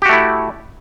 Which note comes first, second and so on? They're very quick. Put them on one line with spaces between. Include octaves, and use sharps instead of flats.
G4 F#4 A3 E4